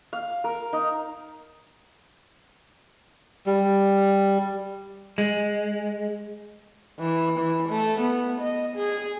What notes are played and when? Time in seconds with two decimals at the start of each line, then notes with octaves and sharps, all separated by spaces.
0.13 F5
0.44 A#4
0.73 D#4
3.46 G3
5.18 G#3
7.00 E3
7.39 E3
7.69 A3
8.00 B3
8.41 D#5
8.77 G#4